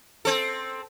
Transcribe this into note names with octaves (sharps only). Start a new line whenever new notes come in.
C4 A4